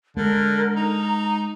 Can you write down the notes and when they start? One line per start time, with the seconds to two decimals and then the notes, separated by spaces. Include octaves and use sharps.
0.17 D3 G#3 A#4
0.76 D#4 A#5